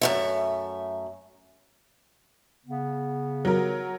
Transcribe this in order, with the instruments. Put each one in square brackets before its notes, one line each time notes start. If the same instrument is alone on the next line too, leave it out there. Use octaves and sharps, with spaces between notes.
[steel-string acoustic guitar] F#2 A3 E5
[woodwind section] C#3 B3
[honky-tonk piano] F#3 A#4